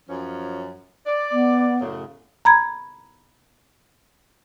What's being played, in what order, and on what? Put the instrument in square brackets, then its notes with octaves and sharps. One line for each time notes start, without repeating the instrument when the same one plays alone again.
[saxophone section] F#2 F3 C#4
D5
[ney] B3
[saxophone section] F#2 A2 C#3
[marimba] A#5 B5 G#6